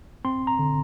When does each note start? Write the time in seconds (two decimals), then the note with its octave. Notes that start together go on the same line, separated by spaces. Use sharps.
0.25 C4 C6
0.47 A#5
0.59 D3